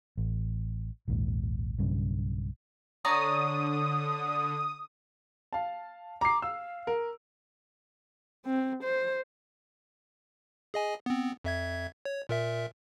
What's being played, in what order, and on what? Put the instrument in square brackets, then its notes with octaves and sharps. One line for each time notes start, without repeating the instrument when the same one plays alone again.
[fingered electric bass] A1
A#1 D#2 G#2
B1 G2 C#3
[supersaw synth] D3 [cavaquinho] C#5 D5 A#5 [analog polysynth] D#6
[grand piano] F5 A5
[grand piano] A#5 C7 [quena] D6
[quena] F5 [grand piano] E6
[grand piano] A#4
[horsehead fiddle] C4
C5
[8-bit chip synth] G#4 D#5 G#5
B3 C4
F2 E5 G#6
C#5
A#2 A#4 E5